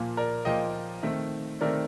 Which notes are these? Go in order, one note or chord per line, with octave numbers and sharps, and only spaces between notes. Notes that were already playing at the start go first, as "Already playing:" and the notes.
Already playing: A#2 F3 A#3
A#4 D5
A#2 F3 A#3 D#5 G5
D#3 A3 C4
D#3 A3 C4 A#4 D5